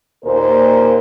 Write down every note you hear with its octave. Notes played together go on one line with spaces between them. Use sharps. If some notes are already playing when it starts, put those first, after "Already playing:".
D#2 A#2 A#4 C5